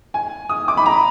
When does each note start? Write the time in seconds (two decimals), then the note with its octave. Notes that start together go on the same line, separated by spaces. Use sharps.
0.14 G#5
0.49 D#6
0.68 D6
0.77 B5
0.86 A#5